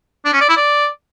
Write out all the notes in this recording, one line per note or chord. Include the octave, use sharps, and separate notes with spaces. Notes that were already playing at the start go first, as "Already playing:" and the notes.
D4
C#4
D5
E4
D5